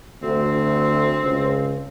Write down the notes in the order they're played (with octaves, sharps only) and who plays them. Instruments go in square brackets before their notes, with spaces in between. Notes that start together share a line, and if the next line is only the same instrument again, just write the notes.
[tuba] D2 [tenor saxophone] C4
[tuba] C#2